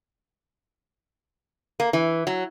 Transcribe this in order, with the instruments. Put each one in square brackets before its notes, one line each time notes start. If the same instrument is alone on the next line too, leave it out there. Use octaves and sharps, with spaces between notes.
[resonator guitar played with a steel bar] A#3
E3
F#3